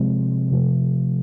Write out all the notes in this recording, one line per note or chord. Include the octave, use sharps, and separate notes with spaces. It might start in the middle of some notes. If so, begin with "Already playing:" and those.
Already playing: C3 F3 G#3 C4
C3 F3 A3